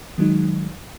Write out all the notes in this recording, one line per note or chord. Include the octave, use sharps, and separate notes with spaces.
D#3 F#3 G#3 D#4